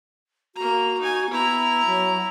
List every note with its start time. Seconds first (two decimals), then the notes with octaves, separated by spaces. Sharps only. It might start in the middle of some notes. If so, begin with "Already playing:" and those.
0.55 A#3 F#4 A#5
1.00 D#4 G#5
1.31 B3 E4 A#5
1.86 F#3